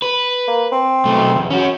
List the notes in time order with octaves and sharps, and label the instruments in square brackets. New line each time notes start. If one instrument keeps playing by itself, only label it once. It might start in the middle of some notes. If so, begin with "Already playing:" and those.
[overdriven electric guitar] B4
[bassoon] A#3
C4
[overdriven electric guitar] B1 A3
E2
C#4 F#4